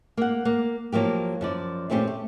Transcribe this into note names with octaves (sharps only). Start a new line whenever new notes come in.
A#3 F#5
A#3
F3 F#3 A#3 G4
F#2 F3 D5
A#2 A3 C4 C#4 E4 G4
A3